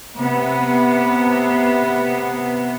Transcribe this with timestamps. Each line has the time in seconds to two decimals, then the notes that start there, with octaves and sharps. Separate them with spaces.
0.17 C3 B3